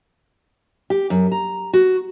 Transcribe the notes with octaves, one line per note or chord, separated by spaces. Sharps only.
G4
F#2
A#5
F#4